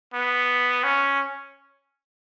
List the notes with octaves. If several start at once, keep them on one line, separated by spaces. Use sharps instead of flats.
B3
C#4